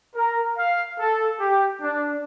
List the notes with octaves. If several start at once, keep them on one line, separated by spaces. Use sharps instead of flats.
A#4
F5
A4
G4
D4